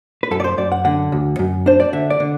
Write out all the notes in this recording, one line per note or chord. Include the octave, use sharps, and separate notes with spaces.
B4
F#2 A4
D5
C5
F#2 D5
F#5
D3 F#5
D2
F#2
D4 C5
D5
D3 E5
D5
D3